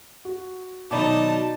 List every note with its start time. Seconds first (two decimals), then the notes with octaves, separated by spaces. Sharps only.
0.25 F#4
0.91 B2 D#3 F#3 D#4 D5 A5 B5 D6